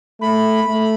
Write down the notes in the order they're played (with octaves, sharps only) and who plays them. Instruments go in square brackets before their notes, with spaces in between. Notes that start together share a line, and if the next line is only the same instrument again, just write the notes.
[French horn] A3 [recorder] B5
[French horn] A3